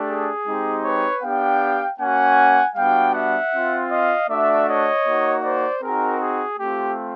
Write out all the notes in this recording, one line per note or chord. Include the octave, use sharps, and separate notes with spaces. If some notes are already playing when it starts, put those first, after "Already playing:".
Already playing: A3 D4 G4
G#4
G#3 C4 D#4 G4
B4 C#5
B3 D4 G4 F5 G5
A#3 C#4 F#4 F#5 G#5
G3 B3 D4 F#4 F5 G5
E5 F#5
C4 F4
D#5 F5
A3 D4 F#4 D5 E5
C#5 D#5
A#3 D#4 F#4
C5 D5
C4 D#4 F#4 G#4 A#4
G#4
A3 C4 F4 G4